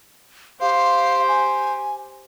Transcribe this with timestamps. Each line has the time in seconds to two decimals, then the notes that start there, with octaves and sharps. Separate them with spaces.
0.61 G4 C5 F5
1.28 G#5